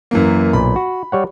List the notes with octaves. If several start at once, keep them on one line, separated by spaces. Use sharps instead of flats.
F#2 E3 A#3
B1 A#2 B5
F#4
G3 C#5 F#5